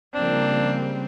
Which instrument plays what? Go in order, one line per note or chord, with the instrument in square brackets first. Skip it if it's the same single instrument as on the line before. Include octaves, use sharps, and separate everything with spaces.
[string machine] C#3 G3 [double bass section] F3 A#3 [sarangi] C4 [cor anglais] D4